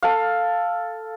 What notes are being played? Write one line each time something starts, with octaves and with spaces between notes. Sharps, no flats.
A4 F5